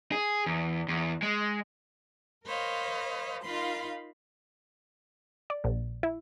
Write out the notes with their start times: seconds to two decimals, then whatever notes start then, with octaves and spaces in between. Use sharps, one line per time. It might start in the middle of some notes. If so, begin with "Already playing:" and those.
0.12 G#4
0.46 E2
0.88 E2
1.23 G#3
2.44 A#4 C5 C#5 D#5 F5 B5
3.43 D#4 F4 A#4 F5 B5 C6
5.50 D5
5.64 A#1
6.03 E4